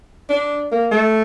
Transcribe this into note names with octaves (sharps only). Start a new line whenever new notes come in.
D4
A#3
A3